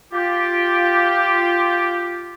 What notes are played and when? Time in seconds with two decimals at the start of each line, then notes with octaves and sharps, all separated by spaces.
0.13 F4 G4